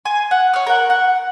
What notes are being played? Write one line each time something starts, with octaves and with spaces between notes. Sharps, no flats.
G#5 C6
F#5
C#5 F6
A#4 F#5
F#5